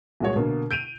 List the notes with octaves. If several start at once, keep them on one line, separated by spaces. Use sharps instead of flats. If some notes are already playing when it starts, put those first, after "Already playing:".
C2 A#2 G#3 F#4 C#5
B2 D3 A#3
G6 D7 D#7 F7